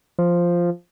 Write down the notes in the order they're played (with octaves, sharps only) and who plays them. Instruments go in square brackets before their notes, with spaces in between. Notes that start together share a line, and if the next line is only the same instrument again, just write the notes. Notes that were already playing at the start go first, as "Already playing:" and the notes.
[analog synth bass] F3